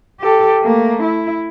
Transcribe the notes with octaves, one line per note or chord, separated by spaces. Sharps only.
G4 A4
A3 A#3
E4